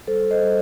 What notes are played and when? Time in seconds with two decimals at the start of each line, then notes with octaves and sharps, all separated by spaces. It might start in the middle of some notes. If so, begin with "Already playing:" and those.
0.07 G3 A4 C5
0.31 C5 D#5
0.43 G3